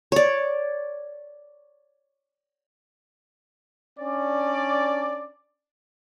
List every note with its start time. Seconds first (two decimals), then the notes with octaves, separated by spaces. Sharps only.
0.12 C#5 D5
3.98 C#4 D4 D5